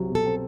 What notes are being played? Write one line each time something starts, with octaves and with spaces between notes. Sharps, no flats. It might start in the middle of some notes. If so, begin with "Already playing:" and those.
Already playing: C2 F#3 C4
B2
A4
C4